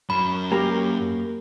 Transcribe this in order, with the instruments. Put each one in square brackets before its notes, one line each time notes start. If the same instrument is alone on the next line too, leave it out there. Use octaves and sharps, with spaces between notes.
[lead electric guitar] F#2 F#3 [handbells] B5
[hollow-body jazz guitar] A#3 [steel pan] G4 A#5